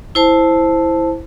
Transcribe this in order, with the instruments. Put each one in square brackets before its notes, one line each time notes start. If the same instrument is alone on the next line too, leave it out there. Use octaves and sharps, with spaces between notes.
[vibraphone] E4 C5 A5